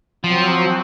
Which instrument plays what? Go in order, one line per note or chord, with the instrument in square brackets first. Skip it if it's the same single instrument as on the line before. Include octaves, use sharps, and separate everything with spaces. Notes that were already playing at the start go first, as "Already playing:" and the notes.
[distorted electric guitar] F3 [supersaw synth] F#3 C4